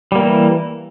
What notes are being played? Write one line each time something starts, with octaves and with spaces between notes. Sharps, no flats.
E3 G3 A#3